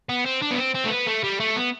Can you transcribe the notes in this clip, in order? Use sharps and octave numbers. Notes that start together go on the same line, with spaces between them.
B3
C4
D4
B3
C4
C4
A3
B3
A3
G3
A3
B3